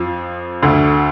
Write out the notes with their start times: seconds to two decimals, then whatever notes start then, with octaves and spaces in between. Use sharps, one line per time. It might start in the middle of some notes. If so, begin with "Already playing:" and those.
Already playing: F2 F3
0.63 D2 D3